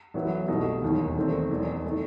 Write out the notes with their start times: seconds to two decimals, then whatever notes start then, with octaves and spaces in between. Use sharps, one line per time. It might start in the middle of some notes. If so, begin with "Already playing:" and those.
0.14 A1 A2 F#3 B3 E4
0.48 C2 B2 A3 D#4
0.82 E1 D#2 D#3
1.16 E2 D#3 A3 C4
1.50 E1 E2 D#3
1.84 D#3 A3